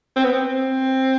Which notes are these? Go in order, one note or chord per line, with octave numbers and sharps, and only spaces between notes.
C4
B3
C4